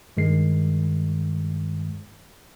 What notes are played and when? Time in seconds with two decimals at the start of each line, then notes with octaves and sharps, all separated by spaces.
0.17 G2 D#3 G#3 C7